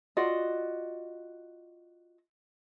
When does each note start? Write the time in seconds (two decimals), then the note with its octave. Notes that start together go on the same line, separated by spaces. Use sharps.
0.17 F4 F#4 D5 D#5